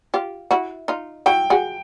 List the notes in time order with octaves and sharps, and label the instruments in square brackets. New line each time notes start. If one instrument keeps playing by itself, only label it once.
[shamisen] F4 G4
E4 F#4
D#4 F4
[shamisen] E4 F#4 [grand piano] G5
[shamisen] F#4 G#4